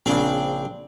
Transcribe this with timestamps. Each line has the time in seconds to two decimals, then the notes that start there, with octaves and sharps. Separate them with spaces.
0.06 A#1 C#3 C4 D4